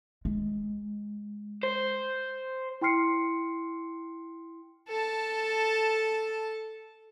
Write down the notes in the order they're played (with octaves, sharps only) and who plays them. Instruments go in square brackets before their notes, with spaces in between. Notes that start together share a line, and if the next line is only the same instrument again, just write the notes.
[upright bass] G#3
[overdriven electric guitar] C5
[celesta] E4 G5 C6 F6 C7 C#7
[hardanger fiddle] A4 A5